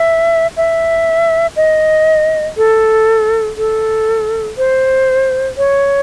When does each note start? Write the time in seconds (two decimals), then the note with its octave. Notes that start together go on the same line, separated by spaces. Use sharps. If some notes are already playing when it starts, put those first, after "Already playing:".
Already playing: E5
0.57 E5
1.56 D#5
2.57 A4
3.57 A4
4.58 C5
5.57 C#5